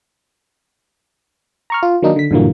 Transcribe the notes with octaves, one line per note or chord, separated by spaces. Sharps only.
A#5 C#6 F6
F4
D#3 F#3 A#3 D4 D#4
D3 B6
G2 A#2 D3 E3 F#3 A#3